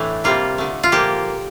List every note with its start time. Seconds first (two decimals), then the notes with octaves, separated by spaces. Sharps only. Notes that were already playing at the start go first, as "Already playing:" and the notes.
Already playing: A2 E3 A3 D4
0.24 C3 G3 A#3 F4
0.58 D3 A3
0.83 F4
0.92 A#2 F3 A#3 G4